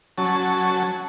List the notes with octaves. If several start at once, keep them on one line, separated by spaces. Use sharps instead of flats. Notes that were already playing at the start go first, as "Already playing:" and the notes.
F#3 C#4 A5